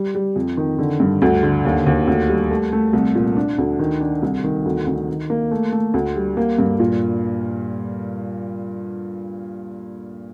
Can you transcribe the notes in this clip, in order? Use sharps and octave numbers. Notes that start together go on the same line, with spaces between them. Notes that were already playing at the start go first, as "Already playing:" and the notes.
Already playing: G3
G3
F2
D#3
D3
G2
D2
D3
D#2
D#2
D2
G3
A3
A3
C2
A#2
D4
D2
D#3
D4
C2
D#3
D2
D2
D#3
A#3
A3
A3
D2
G3
A#3
G2
A#2